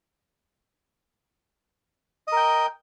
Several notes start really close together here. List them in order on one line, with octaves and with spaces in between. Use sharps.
D#5 A#4 G5